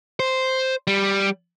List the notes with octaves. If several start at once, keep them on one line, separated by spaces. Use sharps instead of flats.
C5
G3